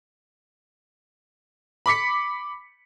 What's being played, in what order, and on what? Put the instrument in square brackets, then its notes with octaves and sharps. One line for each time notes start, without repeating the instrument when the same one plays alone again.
[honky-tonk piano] B5 D6 B6 C#7